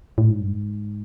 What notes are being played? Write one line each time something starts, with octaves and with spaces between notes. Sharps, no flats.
A2
G#2
G2
G#2